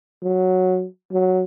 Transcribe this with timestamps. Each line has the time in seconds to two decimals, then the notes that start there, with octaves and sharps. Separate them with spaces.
0.23 F#3
1.12 F#3